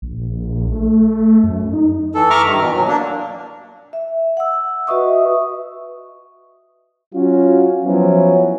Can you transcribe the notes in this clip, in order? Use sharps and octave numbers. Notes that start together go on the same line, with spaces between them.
A#1
A3
F#2
D#4
E3 A4
E5 A#5 C#6 D6 F6
G2 D#3
B2 E3
F#3
A#3 D4
E5
F#5 E6
F#4 B4 D#5 E5 C#6 D#6
F#3 C#4 F4 F#4
F3 F#3 B3 C#4 E4